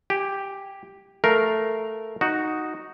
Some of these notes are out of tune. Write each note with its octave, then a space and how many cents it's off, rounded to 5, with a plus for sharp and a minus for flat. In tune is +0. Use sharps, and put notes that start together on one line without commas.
G4 +0 G#5 -25
A3 +0 A#4 +0 F5 +0
D#4 +0 F#4 +0